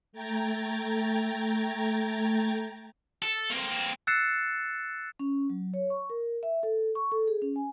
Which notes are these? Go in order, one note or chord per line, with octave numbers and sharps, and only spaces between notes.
A3 G5 A#5 G#6 A6
A4
A#3 C4
E6 F#6 A6 C7 C#7 E7
C#4
F#3
C#5
C#6
A#4
E5
A4
C#6
A4
G#4
C#4
G#5